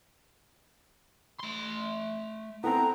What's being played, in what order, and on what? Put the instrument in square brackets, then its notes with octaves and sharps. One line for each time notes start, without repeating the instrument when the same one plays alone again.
[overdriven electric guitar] A3 C6
[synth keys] B3 C4 [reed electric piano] E4 A4 G5 [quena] A#5